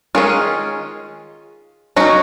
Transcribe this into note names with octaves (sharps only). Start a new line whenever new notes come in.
D#3 G#3 C#4 F4 G#4
F#3 C#4 D#4 F#4